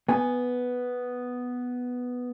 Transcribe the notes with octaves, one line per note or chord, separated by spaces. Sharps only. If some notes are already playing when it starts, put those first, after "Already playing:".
B3 G#5